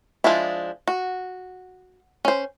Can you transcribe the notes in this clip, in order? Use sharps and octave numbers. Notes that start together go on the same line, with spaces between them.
F3 G#3 D4 E4
F#4
C#4 C5